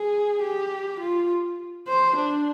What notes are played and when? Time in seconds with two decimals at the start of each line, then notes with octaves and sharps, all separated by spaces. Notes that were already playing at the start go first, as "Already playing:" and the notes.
Already playing: G#4
0.42 G4
1.00 F4
1.88 C5
2.16 D4